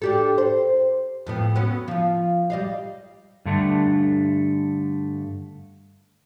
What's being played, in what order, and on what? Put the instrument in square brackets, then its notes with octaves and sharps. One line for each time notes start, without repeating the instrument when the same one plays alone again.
[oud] D4 G4 A4
C5
F2 A2 B3
F#3 B3 C#4
F3 F4
G3 D#5 F5
[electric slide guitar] G2 D3 A3